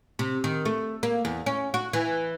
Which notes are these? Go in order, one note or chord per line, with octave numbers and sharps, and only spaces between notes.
C3
D#3
A3
A#3
E2
C#4
F#4
E3